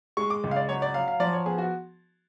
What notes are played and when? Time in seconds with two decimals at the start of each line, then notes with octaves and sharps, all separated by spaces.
0.17 G#3 C#6
0.30 D6
0.44 C#2
0.51 F5
0.56 D5
0.69 F#3 C#5
0.82 D5
0.94 F#3 F5
1.08 F5
1.20 F3 D5
1.33 C#5
1.46 B3 G#4
1.58 F#4